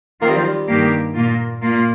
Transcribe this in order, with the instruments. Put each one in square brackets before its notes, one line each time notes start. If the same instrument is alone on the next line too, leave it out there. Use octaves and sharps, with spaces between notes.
[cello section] D#3 C4 F4 [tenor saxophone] A#3
[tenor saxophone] G3
F3
G3
[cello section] G2 D#3 A#3 G4
A#2 A#3 F4
A#2 A#3 F4